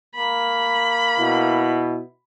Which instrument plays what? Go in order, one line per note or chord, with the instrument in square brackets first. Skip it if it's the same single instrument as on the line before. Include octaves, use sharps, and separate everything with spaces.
[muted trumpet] A#3 [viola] B5
[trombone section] B2 E4